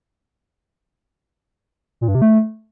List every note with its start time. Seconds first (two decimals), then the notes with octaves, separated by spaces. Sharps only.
2.01 A#2
2.08 G2
2.15 C3
2.22 A3